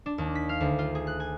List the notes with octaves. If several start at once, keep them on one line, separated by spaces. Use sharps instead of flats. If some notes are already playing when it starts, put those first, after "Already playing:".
D4
D#2
B6
F5
D2
F4
G#4
F#6
G#5